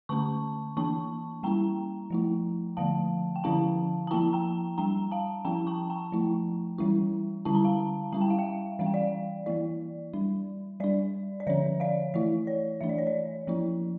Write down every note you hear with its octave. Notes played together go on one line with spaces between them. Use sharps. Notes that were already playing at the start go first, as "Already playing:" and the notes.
D3 A3 C#4 A5 C#6
E3 A#3 D4 A5 C#6
G3 A#3 C#4 E4 G5 A#5
F3 A3 E4
D3 F3 A3 F5 A5
G5
D3 F3 C#4 E4 F5 A5
A5
F3 A#3 E4 G5 A#5
G5 A#5
G3 D4 G5 A#5
F5 A5
F3 C#4 E4 G5 A#5
A5 C#6
G5 A#5
F3 A3 E4
E3 G3 C#4 E4
D3 G3 C#4 E4 A5
A#5
F5 A5
G3 C#4 E4 A5
G5
F5
E5 G5
E3 G3 C#4 F5
G5
D5 F5
E3 A#3 E4 D5
G3 D4
G3 D4 D5
D5
D3 F3 C#4 C#5 E5
D5 F5
E3 A3 E4 D5
C#5
E3 A3 D4 E5
D5
C#5
D5
F3 A#3 C#4 E4